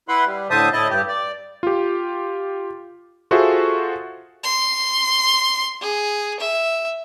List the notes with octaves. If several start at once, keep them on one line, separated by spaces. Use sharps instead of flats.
E4 B4 F#5 B5 C6
G3
A2 D3 C5 E5 A5 D#6
A2 E4 D#5 A5
G2 G4
D5
F4 G4
F4 F#4 G#4 A4 C5 E5
C6
G#4
E5